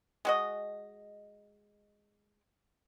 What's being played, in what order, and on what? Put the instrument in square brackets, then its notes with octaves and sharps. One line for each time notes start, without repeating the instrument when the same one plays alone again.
[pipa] G#3 F#4 D#5